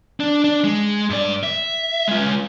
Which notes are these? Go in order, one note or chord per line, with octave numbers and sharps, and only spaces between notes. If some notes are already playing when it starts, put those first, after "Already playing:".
D4
D4
G#3
G2 D5
E5
G#3 F4